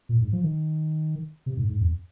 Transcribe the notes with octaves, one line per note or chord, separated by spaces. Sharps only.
A#2
G#2
F3
D#3
C3
G#2
G#2
F2